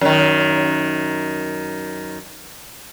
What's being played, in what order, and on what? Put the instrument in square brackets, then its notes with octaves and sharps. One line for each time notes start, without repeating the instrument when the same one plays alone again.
[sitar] F#2 D#3